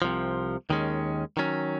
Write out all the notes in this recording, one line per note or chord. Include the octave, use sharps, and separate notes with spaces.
C2 C3 F3
D#2 D#3 G#3 C#4
D#3 F#3 C#4